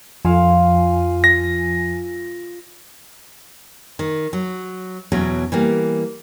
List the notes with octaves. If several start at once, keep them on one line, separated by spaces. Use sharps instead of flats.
F2 F3 F4 F5 G#5
A#6
D#3
F#3
E2 B2 F#3 C#4
E3 G3 A#3